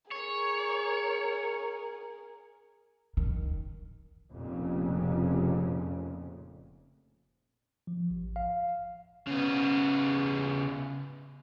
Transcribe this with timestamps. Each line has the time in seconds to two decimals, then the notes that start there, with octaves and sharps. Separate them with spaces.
0.11 G#4 A#4 C#5
3.17 D#3
4.32 F1 F2 A#2 C#3
7.87 F3
8.10 A1
8.36 F5
9.27 C#3 B3